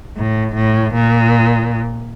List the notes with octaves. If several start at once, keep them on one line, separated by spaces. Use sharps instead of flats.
A2
A2
A#2